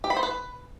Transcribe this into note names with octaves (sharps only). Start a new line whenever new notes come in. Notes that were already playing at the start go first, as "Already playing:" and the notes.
G4
B5
C5
B4